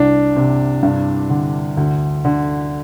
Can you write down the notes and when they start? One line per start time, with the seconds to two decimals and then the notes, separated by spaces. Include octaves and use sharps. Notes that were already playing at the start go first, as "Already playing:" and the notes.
Already playing: C2 D4
0.36 C3
0.83 G2
1.30 D3
1.77 D2
2.25 D3